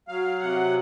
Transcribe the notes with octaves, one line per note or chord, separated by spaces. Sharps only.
F#3 F5
C3 F#5